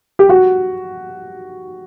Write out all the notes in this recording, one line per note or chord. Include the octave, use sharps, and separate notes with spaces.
G4
F#4